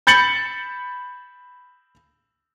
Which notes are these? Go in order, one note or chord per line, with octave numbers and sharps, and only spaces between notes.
B5 G6 A6 C#7 F#7